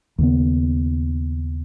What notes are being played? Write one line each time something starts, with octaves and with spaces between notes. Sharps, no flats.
D#2 C#3 B3